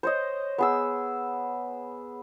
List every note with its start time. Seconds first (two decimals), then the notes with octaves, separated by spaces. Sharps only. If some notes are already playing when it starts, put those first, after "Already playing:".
0.03 C5 C#5 D#5
0.58 B3 G#4 E6